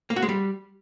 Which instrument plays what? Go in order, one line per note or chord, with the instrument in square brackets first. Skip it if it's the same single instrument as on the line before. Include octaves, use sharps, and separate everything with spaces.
[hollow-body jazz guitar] A#3
F#4
G#3
G3